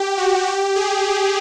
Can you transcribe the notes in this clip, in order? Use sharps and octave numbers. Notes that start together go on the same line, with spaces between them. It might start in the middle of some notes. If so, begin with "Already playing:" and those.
Already playing: G4
F#4
G4
G#4